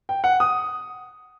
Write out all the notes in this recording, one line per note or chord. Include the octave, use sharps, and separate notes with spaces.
G5
F#5
D#6